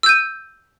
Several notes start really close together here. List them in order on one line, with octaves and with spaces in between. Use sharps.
E6 G6 D#7